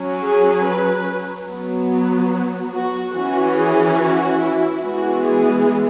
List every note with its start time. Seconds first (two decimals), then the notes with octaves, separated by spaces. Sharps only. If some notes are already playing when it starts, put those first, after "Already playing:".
Already playing: F#3 C#4
0.20 G#4
0.63 B4
1.47 F#3 B3
2.73 F#4
3.14 E3 C#4 F#4
3.57 G#4
3.99 F#4
4.41 E4
4.83 E3 G#3 B3 F#4
5.25 G#4